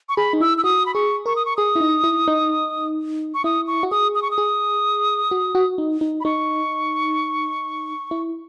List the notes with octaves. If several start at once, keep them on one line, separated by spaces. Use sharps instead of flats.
C#6
G#4 B5
D#4
E4 E6
E6
F#4 D#6
B5
G#4 C#6
A#4 C#6
D#6
C#6
G#4 D#6
E4
D#4
E4
D#4
C#6
E4 D#6
C#6
F#4
G#4 D#6
D#6
C#6
D#6
G#4
F#4
F#4
D#4
D#4
B5
D#4 C#6
E4